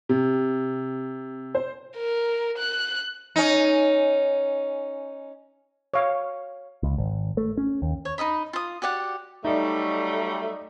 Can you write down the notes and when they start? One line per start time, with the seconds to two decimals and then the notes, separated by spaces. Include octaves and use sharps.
0.09 C3
1.55 C5
1.96 A#4
2.58 F#6
3.36 C#4 D#4
5.94 C#5 F5
6.83 C#2
6.98 G#1
7.37 A3
7.57 C#4
7.82 D#2
8.05 C#5
8.18 D#4 A#4 D#5 B5
8.53 F4 D#6
8.82 F#4 G4 D5 F#5
9.44 F#3 G3 A3 D#4 D5 D#5